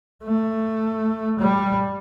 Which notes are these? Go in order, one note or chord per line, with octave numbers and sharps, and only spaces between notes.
A3
G3